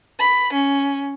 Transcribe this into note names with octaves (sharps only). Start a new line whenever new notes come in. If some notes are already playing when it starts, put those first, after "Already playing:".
B5
C#4